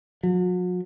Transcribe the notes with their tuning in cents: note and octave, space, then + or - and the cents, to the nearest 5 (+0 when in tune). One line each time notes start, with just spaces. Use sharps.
F#3 -40